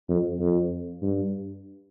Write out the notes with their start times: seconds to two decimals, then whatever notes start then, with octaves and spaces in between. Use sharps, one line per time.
0.09 F2
0.40 F2
1.02 G2